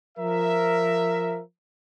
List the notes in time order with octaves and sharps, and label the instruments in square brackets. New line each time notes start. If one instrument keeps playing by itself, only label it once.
[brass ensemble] F3 A#4 E5